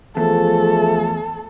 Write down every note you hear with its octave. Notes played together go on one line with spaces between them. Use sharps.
E2 F3 A3 G#4 A4